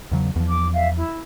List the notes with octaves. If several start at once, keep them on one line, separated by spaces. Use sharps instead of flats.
E2 C#3 F#3
E2 F3
D6
E5 F5
E4